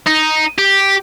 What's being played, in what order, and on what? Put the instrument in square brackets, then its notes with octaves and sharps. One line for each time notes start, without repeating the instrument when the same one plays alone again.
[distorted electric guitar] D#4
G4